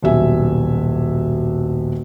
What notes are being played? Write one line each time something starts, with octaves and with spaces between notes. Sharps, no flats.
D#1 B1 E5 G#5